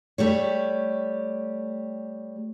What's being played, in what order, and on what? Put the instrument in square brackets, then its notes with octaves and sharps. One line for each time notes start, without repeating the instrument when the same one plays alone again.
[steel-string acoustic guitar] G3 A3 G4 C#5